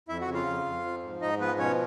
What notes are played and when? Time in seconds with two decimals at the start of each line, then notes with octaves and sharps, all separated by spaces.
0.09 F2 E4 E5
0.21 F#4 F#5
0.28 C#3
0.34 F4 F5
0.46 F2
0.65 F2
0.84 F3
1.02 G#2
1.21 G#2 D#4 D#5
1.40 F3 B3 B4
1.59 B2 C#4 C#5